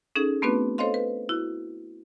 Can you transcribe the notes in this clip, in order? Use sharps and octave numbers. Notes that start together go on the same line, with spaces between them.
C#4 D#4 G#4 A4
A3 B3 C4 D4 F#4 B4
A4 C5 C#5 D#5 F5 C6
B4
E4 F#4